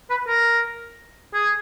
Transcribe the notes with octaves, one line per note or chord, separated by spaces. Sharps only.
B4
A#4
G#4